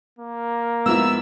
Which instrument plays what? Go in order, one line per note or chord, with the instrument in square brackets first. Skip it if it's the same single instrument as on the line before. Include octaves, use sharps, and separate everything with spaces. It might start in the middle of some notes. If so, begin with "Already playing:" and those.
[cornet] A#3
[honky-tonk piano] G#2 F3 E4 [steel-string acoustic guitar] B3 A#4 [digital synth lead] E6